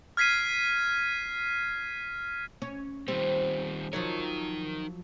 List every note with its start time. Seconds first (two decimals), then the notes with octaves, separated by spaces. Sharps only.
0.17 F6 G#6 B6 C7 D#7
2.62 C#4
3.08 D#3 G3 C4
3.93 F3 F#3 D#4 A#4 C#5